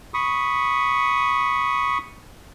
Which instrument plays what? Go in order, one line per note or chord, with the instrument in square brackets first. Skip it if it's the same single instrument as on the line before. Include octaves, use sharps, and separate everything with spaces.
[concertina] B5 C#6 D#6